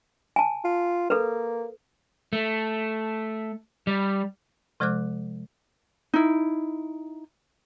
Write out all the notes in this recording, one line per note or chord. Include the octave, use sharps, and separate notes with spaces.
G#5 A5
F4
A#3 A4 B4
A3
G3
C3 F3 G#3 C5 D6 F#6
D#4 E4